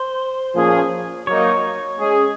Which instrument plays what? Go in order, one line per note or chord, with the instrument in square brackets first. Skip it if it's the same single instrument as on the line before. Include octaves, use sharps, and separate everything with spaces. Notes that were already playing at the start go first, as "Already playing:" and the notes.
Already playing: [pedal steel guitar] C5
[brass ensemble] A#2 F3 A#3 C#4 G#4
[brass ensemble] F#3 A#3 D#4 [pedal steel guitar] C#5
[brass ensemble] G#3 C#4 G#4